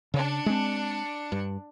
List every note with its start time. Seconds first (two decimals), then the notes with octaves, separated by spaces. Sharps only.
0.14 C#3 D4 C#7
0.46 G#3 C4
1.32 G2